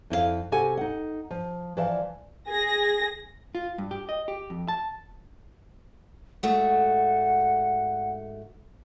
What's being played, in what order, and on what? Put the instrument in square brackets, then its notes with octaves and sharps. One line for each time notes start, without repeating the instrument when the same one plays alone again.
[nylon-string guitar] F2 E4 A4 F5
C3 F#4 G4 A4 F#5 G#5
D#4 F#5
F3
E3 F3 D5 E5 F5 A5
[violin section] G#4 A#6
[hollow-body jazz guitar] F4
G2
G4
D#5
G4
F2
A5
[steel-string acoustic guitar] G#2 A3 F#4 [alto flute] F#5